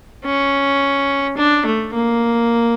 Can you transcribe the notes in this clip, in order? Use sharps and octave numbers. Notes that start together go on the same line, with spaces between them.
C#4
D4
A3
A#3